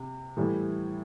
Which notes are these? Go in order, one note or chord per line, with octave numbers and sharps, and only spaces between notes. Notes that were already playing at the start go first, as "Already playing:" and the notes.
Already playing: C3
A2 E3 G3